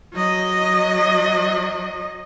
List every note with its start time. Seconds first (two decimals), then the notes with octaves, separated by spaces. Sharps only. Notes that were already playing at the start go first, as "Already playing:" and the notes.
0.14 F#3 D#5